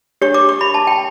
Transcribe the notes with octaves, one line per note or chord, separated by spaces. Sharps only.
D4 G4 C#5 C#6
D6
C#6
B5
A5
G5